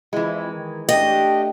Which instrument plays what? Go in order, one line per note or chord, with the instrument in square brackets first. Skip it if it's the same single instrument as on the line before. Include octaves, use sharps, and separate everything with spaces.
[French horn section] F2 E4 [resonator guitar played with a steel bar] E3 G#3
[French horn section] D#3
[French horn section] A3 D4 G4 [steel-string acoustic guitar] D#5 [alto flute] G5